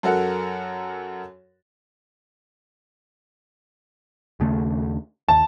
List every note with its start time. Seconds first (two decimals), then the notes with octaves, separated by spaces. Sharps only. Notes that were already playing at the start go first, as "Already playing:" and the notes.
0.03 F#2 F#4 A4 A#4 F#5
4.40 D#2 C#3 A3
5.28 D#2 A5